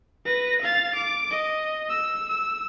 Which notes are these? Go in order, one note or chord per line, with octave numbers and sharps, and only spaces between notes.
B4 A#6
F5 A6
D6
D#5
E6
E6